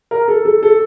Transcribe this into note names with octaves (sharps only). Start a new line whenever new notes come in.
A#4
A4
A4
A4